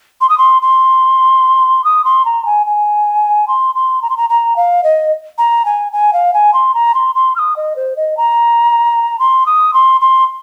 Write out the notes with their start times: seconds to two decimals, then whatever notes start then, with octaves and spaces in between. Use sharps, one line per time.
0.21 C6
0.29 D#6
0.38 C6
0.62 C6
1.84 D#6
2.04 C6
2.25 A#5
2.45 G#5
2.66 G#5
3.48 C6
3.75 C6
4.02 A#5
4.10 C6
4.17 A#5
4.29 A#5
4.56 F5
4.83 D#5
5.38 A#5
5.65 G#5
5.92 G#5
6.13 F5
6.34 G#5
6.53 C6
6.74 A#5
6.94 C6
7.15 C6
7.35 F6
7.39 D#6
7.56 D#5
7.76 C5
7.96 D#5
8.17 A#5
9.19 C6
9.46 D#6
9.73 C6
10.01 C6